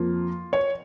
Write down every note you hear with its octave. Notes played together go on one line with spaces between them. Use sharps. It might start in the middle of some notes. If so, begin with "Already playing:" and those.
Already playing: F2 F3 A#3 F4
C#5